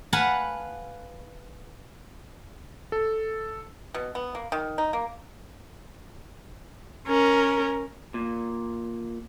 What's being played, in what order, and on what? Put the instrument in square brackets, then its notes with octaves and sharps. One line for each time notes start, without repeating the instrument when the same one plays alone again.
[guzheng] B4 F5 F#5 G#5 A5 B5
[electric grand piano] A4
[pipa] B2
B3
A#3
D#3
D#4
A#3
[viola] C#4 A#4
[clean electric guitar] A#2